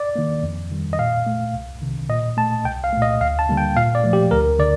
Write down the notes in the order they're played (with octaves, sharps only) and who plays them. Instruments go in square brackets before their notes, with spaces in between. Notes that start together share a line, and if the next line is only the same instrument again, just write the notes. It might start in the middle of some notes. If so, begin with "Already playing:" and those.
Already playing: [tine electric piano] D5
D#3 A#3
F2
D#3 G3
D#5
A#2 F5
A3
C2
C3 D#3
A#2 D#5
A3 A5
C2 G5
F5
A#2 A3
D#5
D2 F5
A5
D3 G3 A#3
G5
A#2 F5
D5
F3 A3
G4
D2 A#4
D3 D5